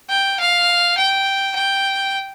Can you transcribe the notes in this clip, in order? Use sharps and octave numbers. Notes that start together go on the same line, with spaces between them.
G5
F5
G5
G5